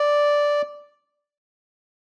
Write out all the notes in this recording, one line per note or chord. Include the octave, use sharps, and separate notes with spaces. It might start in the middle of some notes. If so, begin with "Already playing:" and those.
Already playing: D5